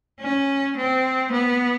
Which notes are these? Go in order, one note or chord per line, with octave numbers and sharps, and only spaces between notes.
C#4
C4
B3